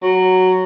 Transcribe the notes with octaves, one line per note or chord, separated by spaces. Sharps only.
F#3